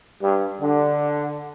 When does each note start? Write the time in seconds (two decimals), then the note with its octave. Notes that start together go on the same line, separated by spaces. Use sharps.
0.21 G2
0.60 D3